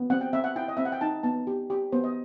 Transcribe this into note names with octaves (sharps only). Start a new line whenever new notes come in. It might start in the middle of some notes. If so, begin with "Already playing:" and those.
Already playing: B3
C4 F#5
G5
C4 E5
F#5
E4 G5
D#5
C4 E5
F#5
G5
D#4 A5
B3 A5
G4
G4
B3 C5
D#5